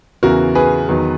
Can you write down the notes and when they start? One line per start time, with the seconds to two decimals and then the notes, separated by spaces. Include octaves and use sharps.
0.23 E2 C#3 E3 F#4 A#4
0.55 G#4 B4
0.88 E2 D#3 F#3